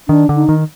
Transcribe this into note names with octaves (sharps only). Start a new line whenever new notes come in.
D#3 D4
D3
D#4
D#3